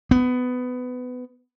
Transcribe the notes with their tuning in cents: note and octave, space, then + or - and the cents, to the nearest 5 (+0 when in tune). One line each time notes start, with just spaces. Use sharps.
B3 +20